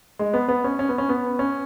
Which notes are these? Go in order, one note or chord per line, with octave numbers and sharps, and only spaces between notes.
G#3
B3
B3
C#4
C#4
B3
C#4
B3
C#4